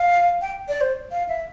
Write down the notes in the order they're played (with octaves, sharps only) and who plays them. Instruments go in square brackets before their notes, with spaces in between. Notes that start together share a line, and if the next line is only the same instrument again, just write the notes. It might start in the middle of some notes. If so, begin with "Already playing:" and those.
Already playing: [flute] F5
G5
D5
C5
F5
E5